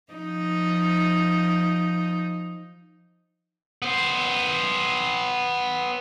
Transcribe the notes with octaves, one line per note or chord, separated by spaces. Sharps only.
F3 D#4
B3 C5